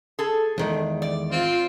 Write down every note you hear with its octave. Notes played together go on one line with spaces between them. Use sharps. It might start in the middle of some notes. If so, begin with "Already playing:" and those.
G#4 A4
E2 D#3 G#3
D5
C4 F4